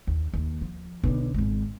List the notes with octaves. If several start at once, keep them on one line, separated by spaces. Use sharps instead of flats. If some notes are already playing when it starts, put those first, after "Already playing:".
D#2
D#2
F3
B1 D3
G#1 G#3